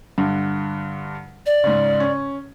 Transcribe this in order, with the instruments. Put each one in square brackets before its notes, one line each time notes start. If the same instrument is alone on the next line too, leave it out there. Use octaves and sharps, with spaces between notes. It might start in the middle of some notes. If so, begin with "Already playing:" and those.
[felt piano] G2 D3
[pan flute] D5
[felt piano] G#2 C#3
C#4